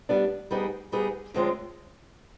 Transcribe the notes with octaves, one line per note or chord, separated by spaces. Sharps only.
G3 B3 D4
G3 B3 D#4 G#4
G3 B3 D#4 G#4
F#2 D3 F3 G#3 C4